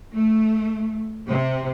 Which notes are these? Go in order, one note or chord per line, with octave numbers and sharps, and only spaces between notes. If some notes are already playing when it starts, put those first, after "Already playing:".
A3
C3